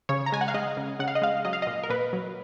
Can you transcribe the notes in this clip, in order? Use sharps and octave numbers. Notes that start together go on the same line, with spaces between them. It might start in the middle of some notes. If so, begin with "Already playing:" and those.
C#3 C#5
A#5
G#3 G#5
F#5
F5
G#3 D#5
C#3
C#3 F#5
F5
D#5
G#3 F5
F#3 D#5
F5
D#5
A#2
A#4
A#2 B4
F#3